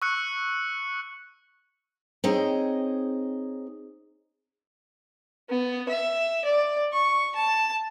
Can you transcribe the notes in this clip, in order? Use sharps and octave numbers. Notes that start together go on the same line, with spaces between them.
C#6 E6 F#6 C#7
C4 D#4 G#4 C#5 D#5 G5
B3
E5
D5
C#6
A5